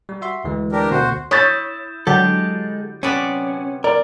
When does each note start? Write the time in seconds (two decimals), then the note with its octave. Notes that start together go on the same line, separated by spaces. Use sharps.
0.09 G3
0.22 F#4 E5 C6
0.44 D2 E3 G#3
0.72 D4 G4 A#4
0.91 D2 B2 A3 F#4 C5
1.31 E4 C#5 D#6 G6 A6
2.07 D3 F#3 G#3 G4 A4
3.03 C3 B3 C#4 D5
3.84 A#4 D5